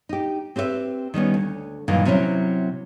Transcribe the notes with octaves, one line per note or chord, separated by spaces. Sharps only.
D#4 G4
C4 G4 B4 C#5 E5
D#3 G3 B3 C#4
D2
G2 A#2 D#3 E3 F#3
C3 F#3 C4 C#4 E4